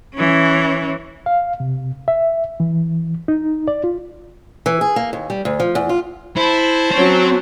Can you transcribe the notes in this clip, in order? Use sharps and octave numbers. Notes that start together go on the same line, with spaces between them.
E3 C#4
F5
C3
E5
E3
D#4
D5
F4
E3
G#4
A#3
D#2
G3
D2
F3
E2
F4
E4 C5 A5
F#3 C4 C#4 C#5